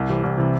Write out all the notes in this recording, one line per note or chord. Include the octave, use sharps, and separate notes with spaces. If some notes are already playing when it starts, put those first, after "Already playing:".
Already playing: C2
C3 E3
C2
C3 E3